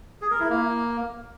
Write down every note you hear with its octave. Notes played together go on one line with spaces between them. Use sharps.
G#4
A#4
E4
A#3